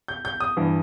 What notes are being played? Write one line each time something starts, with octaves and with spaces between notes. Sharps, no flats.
G6
G6
D#6
G2 E3